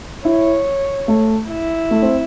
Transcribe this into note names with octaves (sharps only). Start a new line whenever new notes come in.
E4 C#5
A3
E4
A3
C4